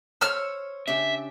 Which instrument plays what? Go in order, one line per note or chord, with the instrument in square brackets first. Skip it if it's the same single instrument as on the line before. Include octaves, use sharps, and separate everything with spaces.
[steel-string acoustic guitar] C5 C#5 [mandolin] E6 F6
[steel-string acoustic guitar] C#3 D4 G4 [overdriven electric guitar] E5